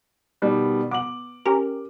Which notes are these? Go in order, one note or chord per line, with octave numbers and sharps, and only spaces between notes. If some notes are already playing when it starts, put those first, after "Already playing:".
B2 D#3 G3
B3 D6 F#7
C#4 G4 A#4